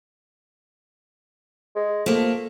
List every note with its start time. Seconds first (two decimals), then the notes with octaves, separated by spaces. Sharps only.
1.76 G#3
2.06 F3 A3 A#3